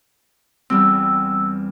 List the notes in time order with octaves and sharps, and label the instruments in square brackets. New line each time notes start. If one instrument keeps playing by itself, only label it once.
[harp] E2 G3 C4 [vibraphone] E6